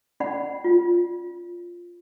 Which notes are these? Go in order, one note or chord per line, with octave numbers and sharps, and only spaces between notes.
C#4 D5 F#5 B5
F4